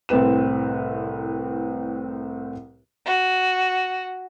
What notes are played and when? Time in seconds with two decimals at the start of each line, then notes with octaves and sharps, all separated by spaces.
0.09 C2 A2 C4 B4 E7
3.06 F#4